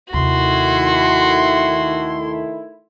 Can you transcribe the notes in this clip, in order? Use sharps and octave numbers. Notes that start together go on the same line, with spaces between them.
D#2 C3 D#3 A3 E4 F#4 C6